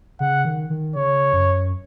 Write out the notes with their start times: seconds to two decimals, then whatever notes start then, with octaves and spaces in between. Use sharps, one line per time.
0.20 C#3 F#5
0.45 D#3
0.70 D#3
0.96 C#3 C#5
1.33 F#2